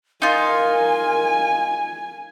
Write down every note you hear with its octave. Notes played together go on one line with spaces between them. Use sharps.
D#4 F4 A#4 G#5